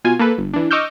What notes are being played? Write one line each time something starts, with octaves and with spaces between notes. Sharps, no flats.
B2 F4 G#5
A#3 A4 B4
G1
E3 D4
D#5 C#6 D6 E6 F6 G6